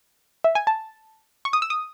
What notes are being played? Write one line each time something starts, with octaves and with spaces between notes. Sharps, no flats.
E5
G#5
A5
C#6
D#6
E6
D#6